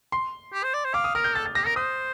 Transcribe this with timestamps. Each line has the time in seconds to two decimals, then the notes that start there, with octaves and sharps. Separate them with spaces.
0.12 C6
0.53 G4
0.63 C5
0.74 D5
0.85 C5
0.94 F5 D6
1.04 D#6
1.15 A#4 F6
1.24 G6
1.35 A4 A6
1.46 A6
1.55 G4 A#6
1.66 A#4 A#6
1.76 C5 D#6